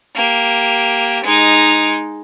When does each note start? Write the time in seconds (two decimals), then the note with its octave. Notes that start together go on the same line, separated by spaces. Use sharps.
0.16 A#3 G4
1.24 G#3 D#4